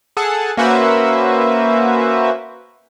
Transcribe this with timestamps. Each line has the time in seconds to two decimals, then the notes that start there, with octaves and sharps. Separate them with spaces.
0.17 G#4 A4 F#5 A5
0.57 A#3 C#4 F#4 B4 C5 E5